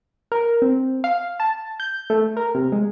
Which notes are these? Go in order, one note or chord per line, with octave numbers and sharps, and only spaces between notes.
A#4
C4
F5
A5
G6
A3
A#4
C3
G#3